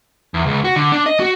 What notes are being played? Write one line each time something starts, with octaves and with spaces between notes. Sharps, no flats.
E2
C#2
F#4
D3
D4
D#5
F#4